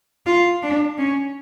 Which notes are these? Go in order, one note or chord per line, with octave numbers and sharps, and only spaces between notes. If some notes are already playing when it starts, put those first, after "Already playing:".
F4
D4
C#4